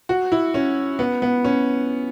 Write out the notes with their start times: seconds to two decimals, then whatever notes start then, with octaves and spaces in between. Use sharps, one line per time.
0.09 F#4
0.32 E4
0.54 C#4
0.99 B3
1.22 B3
1.44 C#4